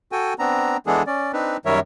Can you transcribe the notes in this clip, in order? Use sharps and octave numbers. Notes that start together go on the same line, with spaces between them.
F#4 A4 G5 G#5
B3 C4 D4 A#5
E3 G#3 B3 D4 G#4 A4
C#4 D5
C4 D4 D#4 B4
F#2 D#3 G3 A#4 C#5 E5